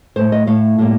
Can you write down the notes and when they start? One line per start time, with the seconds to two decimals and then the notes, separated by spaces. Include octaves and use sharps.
0.16 A2 A3 C5
0.32 D#5
0.47 A2 A3 F5
0.79 A2 G3 A#3